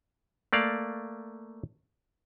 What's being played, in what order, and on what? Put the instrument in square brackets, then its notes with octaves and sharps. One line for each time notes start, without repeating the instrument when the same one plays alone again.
[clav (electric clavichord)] A3 A#3 D5 F5